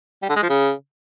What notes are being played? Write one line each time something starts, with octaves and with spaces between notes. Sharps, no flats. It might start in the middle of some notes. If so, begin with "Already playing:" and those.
G3
D3
G#3
F3
C#3